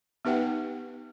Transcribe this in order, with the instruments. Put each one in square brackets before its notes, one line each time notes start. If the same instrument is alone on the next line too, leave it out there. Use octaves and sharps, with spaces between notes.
[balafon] B3 D#4 G4 B4 F#5 G5